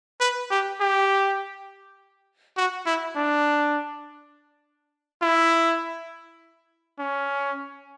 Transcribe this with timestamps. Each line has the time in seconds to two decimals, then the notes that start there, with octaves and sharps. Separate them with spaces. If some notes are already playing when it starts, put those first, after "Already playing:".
0.21 B4
0.51 G4
0.81 G4
2.57 F#4
2.86 E4
3.16 D4
5.22 E4
6.99 C#4